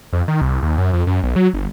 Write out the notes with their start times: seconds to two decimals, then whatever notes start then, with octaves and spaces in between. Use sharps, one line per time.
0.13 F2
0.28 D#3
0.42 C2
0.63 D#2
0.78 F#2
0.93 F2
1.07 F#2
1.23 B1
1.36 F#3
1.54 G1